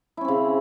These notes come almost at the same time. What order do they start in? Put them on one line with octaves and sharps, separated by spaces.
E4 C#4 C4 C#3